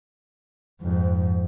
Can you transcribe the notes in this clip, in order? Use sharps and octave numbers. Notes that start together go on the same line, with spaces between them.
F2 G#2